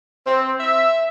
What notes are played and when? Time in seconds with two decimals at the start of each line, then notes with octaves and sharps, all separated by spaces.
0.25 C4
0.60 E5